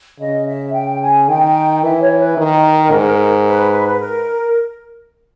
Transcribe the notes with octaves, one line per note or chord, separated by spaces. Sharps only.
C#3 D#5
E5
G5
G#5
D#3 G5
E3 E5
C#5
B4
D#3 A#4
G#2
B4
B4
A#4